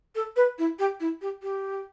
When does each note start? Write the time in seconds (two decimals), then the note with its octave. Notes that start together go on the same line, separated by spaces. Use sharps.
0.15 A4
0.36 B4
0.59 E4
0.79 G4
1.00 E4
1.22 G4
1.42 G4